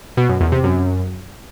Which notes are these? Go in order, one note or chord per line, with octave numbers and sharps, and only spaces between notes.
B2
F#2
E2
C3
F#2